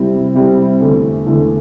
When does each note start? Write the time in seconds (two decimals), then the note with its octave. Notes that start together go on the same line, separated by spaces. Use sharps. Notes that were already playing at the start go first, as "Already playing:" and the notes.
Already playing: C3 G3 C4 E4
0.34 C3 G3 C4 E4
0.80 E2 D3 A3
1.25 E2 D3 A3